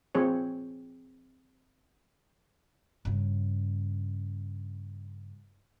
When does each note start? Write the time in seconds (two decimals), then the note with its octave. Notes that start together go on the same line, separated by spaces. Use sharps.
0.15 F3 C4 G#4 C#5
3.05 G2 C#3